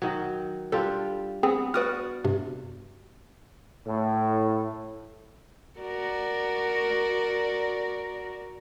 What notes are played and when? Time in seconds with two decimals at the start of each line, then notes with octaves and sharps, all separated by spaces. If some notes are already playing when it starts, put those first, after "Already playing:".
0.02 D#3 F#3
0.72 G3 D4 F4 A4
1.43 B3 C4 G#4 E6
1.74 F#4 B4 D5 F#5 D#6 F6
2.24 G2 C3
3.87 A2
5.79 F#4 A#4 D5